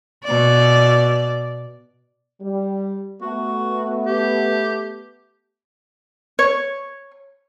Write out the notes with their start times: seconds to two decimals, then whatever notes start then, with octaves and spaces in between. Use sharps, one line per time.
0.24 B2 D5
2.42 G3
3.22 A3 B3 F#4
4.06 G4
6.39 C#5